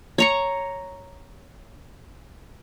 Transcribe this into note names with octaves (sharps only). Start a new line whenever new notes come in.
C#5 A#5 C#6